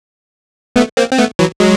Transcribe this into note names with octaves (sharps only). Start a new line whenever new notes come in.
A3 B3
A#3 C4
C4
A3 B3
E3 F#3
F#3 G#3